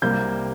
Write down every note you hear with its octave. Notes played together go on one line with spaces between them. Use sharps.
C2 C3 G3 A#3 G6